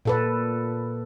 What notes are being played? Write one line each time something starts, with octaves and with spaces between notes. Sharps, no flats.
A#2 A4 B4